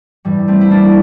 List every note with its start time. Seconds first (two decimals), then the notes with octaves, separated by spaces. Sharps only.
0.25 G2 E3 G3
0.48 A3 C4
0.61 E4
0.71 A#3 D4